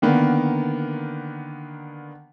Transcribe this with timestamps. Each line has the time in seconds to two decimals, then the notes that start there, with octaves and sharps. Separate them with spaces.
0.02 D3 D#3 A#3 B3